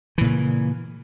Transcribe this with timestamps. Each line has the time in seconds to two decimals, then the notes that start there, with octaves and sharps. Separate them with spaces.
0.18 E3
0.21 A#2
0.24 C#3